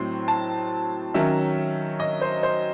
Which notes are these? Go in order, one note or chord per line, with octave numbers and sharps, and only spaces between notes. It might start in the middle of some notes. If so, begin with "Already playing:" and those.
Already playing: A2 F#3 C4 C6
A5
D#3 F#3 C#4 E5
D#5
C5
C5